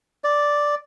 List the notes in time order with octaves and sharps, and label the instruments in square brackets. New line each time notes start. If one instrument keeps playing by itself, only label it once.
[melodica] D5